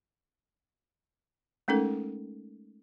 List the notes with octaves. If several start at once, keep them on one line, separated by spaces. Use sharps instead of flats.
G#3 A3 C#4 D#4 A4 A#4